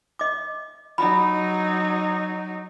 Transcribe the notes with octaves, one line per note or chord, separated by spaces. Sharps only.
D#5 D6
F#3 D#4 B5